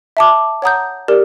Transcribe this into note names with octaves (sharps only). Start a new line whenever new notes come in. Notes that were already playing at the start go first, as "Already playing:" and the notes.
E5 A5 D6
C#5 F#5 A#5 D#6 G6
G4 A#4 D5